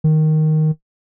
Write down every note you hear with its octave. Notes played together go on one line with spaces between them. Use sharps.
D#3